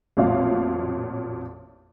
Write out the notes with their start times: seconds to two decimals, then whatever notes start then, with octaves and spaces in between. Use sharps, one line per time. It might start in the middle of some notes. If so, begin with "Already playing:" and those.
0.17 A1 F2 A#2 F#3 F5